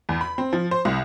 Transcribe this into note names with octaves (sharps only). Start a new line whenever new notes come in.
E2
B5
C4
F3
C5
C2